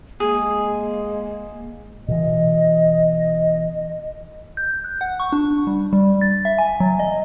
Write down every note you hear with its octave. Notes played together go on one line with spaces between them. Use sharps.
G#3 A#3 G#4
B2 E3 D#5
G6
F#6
F#5
C#6
D4
G3
G3
A6
E5
G#5
F#3
D#5